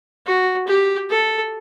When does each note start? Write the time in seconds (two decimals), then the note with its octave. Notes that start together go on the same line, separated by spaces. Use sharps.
0.26 F#4
0.68 G4
1.10 A4